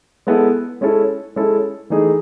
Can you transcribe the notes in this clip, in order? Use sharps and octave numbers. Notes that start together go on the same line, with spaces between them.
G#3 B3 E4 A4
G#3 C#4 E4 A4
G#3 C#4 E4 A4
E3 A3 D#4 G#4